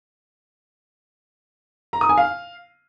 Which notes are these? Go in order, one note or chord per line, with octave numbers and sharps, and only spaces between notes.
A#5
D#6
G#5
F5